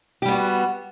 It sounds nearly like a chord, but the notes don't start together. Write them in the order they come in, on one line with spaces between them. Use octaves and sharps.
G4 G3 B3 F#4